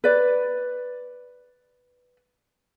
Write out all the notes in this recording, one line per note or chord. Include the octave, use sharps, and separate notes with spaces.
B4 D5